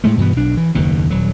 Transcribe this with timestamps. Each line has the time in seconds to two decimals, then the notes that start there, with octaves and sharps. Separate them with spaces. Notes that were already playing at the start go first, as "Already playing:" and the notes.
0.04 A2 G#3 A3
0.17 G2 B2 E3 B3
0.36 B1 D4
0.57 E3
0.75 F#1 D#2 B2
1.10 D#1 F#3